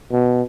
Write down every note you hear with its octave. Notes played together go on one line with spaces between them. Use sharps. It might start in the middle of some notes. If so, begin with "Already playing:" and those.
B2